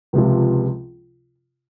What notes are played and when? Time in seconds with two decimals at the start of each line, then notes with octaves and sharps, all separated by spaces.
0.13 C#2 C3 F3